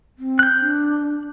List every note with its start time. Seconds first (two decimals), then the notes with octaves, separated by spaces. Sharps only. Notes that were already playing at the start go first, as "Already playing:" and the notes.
0.19 C4
0.39 F#6 G6
0.61 D4